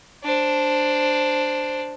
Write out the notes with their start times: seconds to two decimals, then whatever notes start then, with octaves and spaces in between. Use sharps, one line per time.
0.24 D4 C5